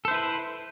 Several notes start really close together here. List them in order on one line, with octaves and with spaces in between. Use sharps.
A4 C5 E4 B4